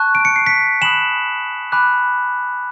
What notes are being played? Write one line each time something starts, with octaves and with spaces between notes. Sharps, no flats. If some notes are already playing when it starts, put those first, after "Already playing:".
Already playing: A5 C#6 F#6
D7
C#7
C7
B6 C#7
G#5 B5 D#6 F#6 E7 F#7
G#5 B5 D6 F#6